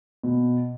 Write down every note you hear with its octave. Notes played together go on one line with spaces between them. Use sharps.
B2